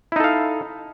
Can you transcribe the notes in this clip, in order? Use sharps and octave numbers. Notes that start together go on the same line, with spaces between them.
D#4 E4 A4 F5